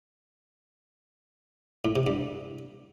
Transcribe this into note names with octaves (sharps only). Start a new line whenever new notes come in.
A2
C3
G2